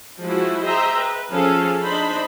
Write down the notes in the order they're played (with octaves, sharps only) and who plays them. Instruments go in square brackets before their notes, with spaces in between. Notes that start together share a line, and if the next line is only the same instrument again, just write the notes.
[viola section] F3 G#3 E4 F#4
G#4 C5 D#5 E5 G5 A#5
B4
F3 C#4 G#4 A4 F5
D4 D#4 C5 B5